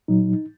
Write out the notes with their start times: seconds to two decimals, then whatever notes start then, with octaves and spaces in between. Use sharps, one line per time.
0.08 A#2 F#3 D#4